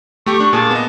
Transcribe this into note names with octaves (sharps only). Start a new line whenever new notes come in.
A3 G4 C#6
D4 C#6
A#2 G#4 A5
B3 D#5